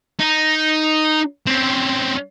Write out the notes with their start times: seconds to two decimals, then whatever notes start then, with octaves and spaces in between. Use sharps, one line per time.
0.19 D#4
1.47 C4 C#4